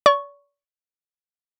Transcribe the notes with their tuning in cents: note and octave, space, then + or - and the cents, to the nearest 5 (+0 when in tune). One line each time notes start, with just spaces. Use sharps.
D5 -45 C#6 +0